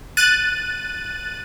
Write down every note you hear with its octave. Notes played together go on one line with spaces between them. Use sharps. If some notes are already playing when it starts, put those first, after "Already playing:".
F#6 A6 D#7